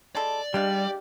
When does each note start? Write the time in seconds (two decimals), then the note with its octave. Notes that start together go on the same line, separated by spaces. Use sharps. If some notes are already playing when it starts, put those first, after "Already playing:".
0.15 G#3 E4 A4 D5
0.54 G3 G#3 D4 G4 F5